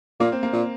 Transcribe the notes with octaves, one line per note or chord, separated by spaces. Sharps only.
A#2 A#3
C4
A#3
A#2